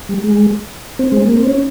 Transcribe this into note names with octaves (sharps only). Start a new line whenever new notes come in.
G3
G#3
C4
G#3
A#3
C4
C#4